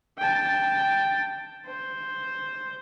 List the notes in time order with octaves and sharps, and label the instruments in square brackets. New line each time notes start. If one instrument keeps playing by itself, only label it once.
[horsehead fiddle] G5 A5
C5